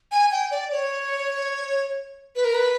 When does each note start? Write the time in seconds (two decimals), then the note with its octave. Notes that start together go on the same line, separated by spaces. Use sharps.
0.12 G#5
0.32 G5
0.51 D5
0.72 C#5
2.36 B4
2.45 A#4
2.54 B4